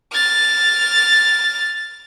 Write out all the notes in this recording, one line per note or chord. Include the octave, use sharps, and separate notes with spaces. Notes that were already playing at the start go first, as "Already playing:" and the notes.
F6 A6